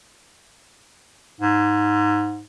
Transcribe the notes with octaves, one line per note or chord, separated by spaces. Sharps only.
G#2